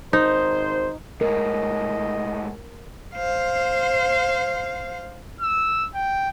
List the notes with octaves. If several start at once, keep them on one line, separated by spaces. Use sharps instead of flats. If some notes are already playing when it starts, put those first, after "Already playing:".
G#1 D#4 C5
A2 G#3 A#4 D#5
C5 F5
E6
G5